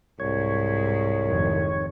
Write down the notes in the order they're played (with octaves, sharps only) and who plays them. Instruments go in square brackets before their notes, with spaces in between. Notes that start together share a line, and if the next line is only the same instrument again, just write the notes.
[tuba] C2 [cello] G#2 [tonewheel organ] C#5
[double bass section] F1 F2 D#3